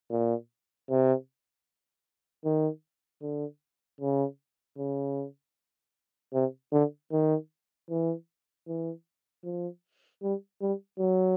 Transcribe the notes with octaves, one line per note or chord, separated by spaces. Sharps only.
A#2
C3
D#3
D3
C#3
C#3
C3
D3
D#3
E3
E3
F3
G3
G3
F#3